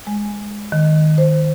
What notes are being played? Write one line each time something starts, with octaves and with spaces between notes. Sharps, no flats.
G#3
D#3
C5